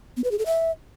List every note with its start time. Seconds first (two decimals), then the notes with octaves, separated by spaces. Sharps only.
0.17 B3
0.24 B4
0.31 G#4
0.39 A4
0.46 E5